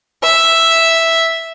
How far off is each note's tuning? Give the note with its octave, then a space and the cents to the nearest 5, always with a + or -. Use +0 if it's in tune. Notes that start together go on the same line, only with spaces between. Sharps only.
E5 +0